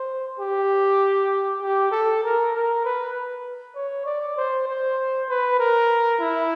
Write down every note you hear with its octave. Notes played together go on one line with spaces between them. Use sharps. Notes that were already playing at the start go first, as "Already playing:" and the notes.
Already playing: C5
G4
G4
A4
A#4
A#4
B4
C#5
D5
C5
C5
B4
A#4
E4